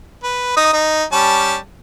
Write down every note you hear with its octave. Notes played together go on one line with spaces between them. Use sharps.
B4
D#4 D#6
D#4
G3 C#4 A5